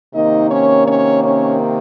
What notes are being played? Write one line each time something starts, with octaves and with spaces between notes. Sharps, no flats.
C3 D#3 A#3 D#4 D#5
C#4 C#5
C#4 C#5
C#4 C#5